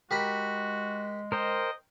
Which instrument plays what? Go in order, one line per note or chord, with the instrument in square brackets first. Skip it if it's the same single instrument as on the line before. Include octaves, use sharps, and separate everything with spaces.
[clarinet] G#3 [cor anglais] F#4 [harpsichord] G4 A#4 B5
[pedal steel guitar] A#4 C5 G5 [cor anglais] D#5